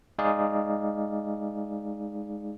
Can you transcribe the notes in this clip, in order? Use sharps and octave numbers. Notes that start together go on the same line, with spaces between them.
G#3 D#4 G#4 D5 F5